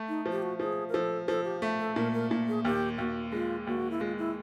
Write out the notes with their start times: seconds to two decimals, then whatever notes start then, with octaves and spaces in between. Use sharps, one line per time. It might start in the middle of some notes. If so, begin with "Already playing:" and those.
Already playing: A3
0.08 D#4
0.26 F3
0.32 G4
0.42 F#4
0.60 F3 G#4
0.89 A#4
0.94 F3 A4
1.28 F3 A4
1.45 G4
1.62 A3
1.80 A4
1.96 A#2 A#4
2.14 A#4
2.31 A#2
2.48 G#4
2.65 D#2 G4
2.98 D#2 F#4
3.32 G#3 F4
3.67 D#2 F#4
3.91 E4
4.00 G#3 F4
4.18 E4